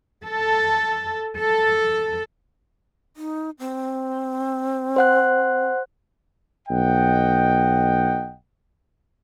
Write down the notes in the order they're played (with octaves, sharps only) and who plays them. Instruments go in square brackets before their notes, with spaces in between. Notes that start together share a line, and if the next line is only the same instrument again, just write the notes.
[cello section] A4
A4
[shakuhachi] D#4
C4
[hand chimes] C5 F#5 F#6
[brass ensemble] B1 D#5 F#5 G5